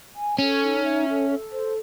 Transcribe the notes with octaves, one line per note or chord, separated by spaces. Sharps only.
G#5
C#4 A4
D#4
E5
A4
A4
C5